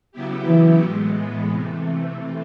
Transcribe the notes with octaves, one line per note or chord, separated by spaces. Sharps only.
C#3 F#3 B3 E4 G4
E3
A2 E3 G#3 B3
C3 E3 A3